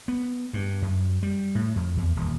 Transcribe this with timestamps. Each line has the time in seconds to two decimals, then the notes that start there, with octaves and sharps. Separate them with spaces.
0.08 B3
0.53 G2
0.82 F#2
1.23 G3
1.55 A2
1.76 F2
1.97 E2
2.16 D#1